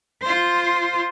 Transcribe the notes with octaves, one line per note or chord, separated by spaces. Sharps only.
F4 C5